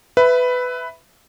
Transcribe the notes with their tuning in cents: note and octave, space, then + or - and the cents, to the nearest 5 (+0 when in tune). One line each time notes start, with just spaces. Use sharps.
B4 +15 E5 +0 B5 +0